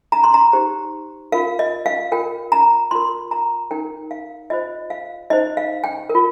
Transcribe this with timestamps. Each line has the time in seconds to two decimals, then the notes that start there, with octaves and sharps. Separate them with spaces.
0.12 A#5
0.24 C6
0.34 A#5
0.53 D#4 G4 C5
1.32 F4 A#4 F5
1.59 D#5
1.86 F5
2.12 F4 A#4 G5
2.52 A#5
2.91 F4 A#4 C6
3.31 A#5
3.71 D#4 A#4 G5
4.11 F5
4.50 F4 C5 D#5
4.90 F5
5.30 D#4 C5 D#5
5.57 F5
5.84 G5
6.09 A#4
6.15 F4